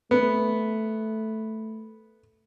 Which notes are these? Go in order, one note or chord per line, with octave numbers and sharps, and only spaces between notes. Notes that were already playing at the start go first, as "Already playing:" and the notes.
A3 B3